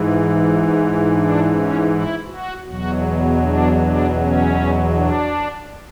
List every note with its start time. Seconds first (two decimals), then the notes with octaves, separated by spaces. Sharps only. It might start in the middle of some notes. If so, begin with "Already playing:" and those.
Already playing: G#2 E3
1.13 D4
1.50 C#4
1.88 E4
2.26 F#4
2.64 E2 B2 F#3 F#4
3.41 D4
3.80 D4
4.17 C#4
4.94 D4